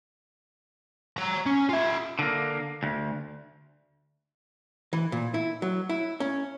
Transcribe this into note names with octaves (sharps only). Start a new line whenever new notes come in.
C#5 A#5
C#4
F4 E5
D3 A#3
D2
E3
A#2
E4
F#3
E4
C#4